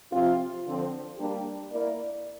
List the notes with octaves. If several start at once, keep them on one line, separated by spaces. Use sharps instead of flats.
C3 F3 C4 F4
D3 F3 C4
G3 A#3 D4 G4
A#3 E4 A#4 D5